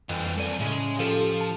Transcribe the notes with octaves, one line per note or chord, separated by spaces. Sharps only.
F2 E3 G3 F#6
C2 A4 D5 G#5
A2 C#3 G#3 C#4
F3 G4 A4 F5
A5